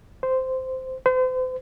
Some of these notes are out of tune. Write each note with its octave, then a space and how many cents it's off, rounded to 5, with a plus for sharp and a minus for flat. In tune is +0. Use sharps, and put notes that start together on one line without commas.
C5 -10
C5 -40